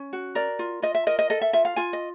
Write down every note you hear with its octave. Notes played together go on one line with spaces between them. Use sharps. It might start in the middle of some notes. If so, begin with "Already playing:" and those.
Already playing: C#4
F#4
A#4 D5
F4
F4 D#5
E5
A#4 D#5
D#5
A4 D#5
E5
F4 E5
F5
F4 G#5
D#5